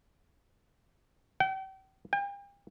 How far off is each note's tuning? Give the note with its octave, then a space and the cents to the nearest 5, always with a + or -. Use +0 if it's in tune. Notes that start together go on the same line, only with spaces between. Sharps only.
G5 -40
G5 +40